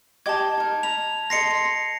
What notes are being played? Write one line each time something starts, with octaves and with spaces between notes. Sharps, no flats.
G4 D#5 A5 D6 G#6
D#4 A#4
A#5 B5 F7
A4 D#5 C6 A#6 C7 C#7
C6